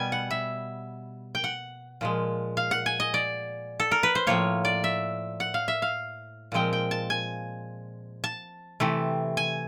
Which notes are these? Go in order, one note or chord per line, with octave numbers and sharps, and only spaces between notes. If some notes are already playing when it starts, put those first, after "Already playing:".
Already playing: B2 G3 B3 G#5
F#5
E5
G5
F#5
A#2 F3 G#3
F5
F#5
G#5
D#5
D5
A4
A#4
B4
C5
A2 F3 A#3 C#5
D5
E5
F#5
F5
E5
F5
A#2 F3 G#3 C4 G5
G5
A5
G#5
A5
C3 E3 A3
G#5